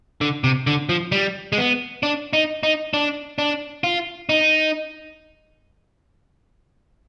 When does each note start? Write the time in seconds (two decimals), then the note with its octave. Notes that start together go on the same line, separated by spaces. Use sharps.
0.21 D3
0.44 C3
0.67 D3
0.89 F3
1.12 G3
1.53 G#3
1.58 B3
2.03 D4
2.33 D#4
2.63 D#4
2.94 D4
3.38 D4
3.84 F4
4.29 D#4